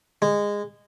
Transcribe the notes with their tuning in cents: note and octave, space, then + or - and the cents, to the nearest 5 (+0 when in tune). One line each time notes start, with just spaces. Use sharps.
G#3 -20